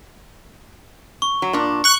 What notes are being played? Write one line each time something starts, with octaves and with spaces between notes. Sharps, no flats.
C#6
F#3
A#2 D4
C#6 F#6